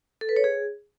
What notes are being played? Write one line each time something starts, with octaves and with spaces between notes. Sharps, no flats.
A4
B4
C#5
G#4